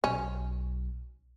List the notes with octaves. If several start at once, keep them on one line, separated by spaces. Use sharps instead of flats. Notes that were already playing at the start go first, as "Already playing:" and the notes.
B1 C#4